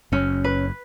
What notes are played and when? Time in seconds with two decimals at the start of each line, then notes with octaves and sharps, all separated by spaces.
0.12 F#1 F#2 C#4
0.44 B4